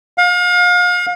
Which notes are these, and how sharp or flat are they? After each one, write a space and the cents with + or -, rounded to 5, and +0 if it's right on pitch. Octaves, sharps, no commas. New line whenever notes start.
F5 +35